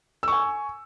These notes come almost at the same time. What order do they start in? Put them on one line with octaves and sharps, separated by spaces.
E6 C#6 G#5